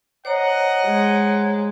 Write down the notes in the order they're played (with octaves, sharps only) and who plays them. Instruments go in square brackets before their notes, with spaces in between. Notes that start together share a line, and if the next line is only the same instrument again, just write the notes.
[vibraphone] C5 C#5 A#5 [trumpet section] D#5 F#5
[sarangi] G#3